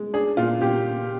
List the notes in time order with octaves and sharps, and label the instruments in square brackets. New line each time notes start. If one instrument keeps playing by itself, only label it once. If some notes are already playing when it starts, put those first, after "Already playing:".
Already playing: [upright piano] G#3
D4 G#4
A#2 F4
A#2 G4